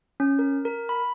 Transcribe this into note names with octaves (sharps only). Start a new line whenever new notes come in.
C#4
A#4
A#4
B5